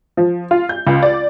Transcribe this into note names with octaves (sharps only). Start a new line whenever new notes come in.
F3
F4
G6
C#2
D5